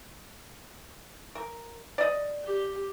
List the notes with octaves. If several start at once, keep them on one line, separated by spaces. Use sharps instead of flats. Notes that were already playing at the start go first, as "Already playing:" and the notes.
A#4
D5 D#5
G4